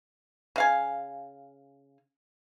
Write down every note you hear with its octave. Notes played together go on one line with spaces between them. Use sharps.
C#3 F5 G#5